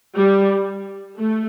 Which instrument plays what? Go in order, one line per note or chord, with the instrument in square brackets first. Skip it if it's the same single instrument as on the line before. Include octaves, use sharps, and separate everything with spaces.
[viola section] G3
A3